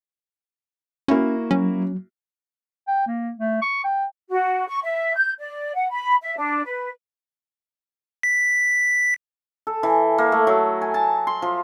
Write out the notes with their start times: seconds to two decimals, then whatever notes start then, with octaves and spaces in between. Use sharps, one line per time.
1.08 A#3 C#4 E4 F#4
1.51 F#3 C#4
2.87 G5
3.07 A#3
3.39 A3
3.62 C#6
3.84 G5
4.29 F#4
4.67 C#6
4.83 E5
5.15 G6
5.39 D5
5.74 F#5
5.91 B5
6.22 E5
6.37 D4
6.65 B4
8.23 B6
9.67 A4
9.83 E3
10.18 A#3
10.32 A3
10.47 F#3
10.82 G#5
10.94 A5
11.27 C6
11.42 F3